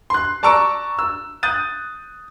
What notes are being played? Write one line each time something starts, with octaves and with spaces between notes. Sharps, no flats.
C6 F#6
D5 A5 A#5 C#6 E6 D7
E6
D#6 F#6 G6 A6 D#7